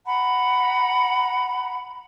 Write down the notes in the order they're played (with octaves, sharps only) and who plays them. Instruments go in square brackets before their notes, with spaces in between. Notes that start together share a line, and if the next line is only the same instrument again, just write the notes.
[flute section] F#5 A#5 B5